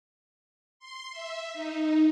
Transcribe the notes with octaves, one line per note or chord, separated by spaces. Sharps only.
C6
E5
D#4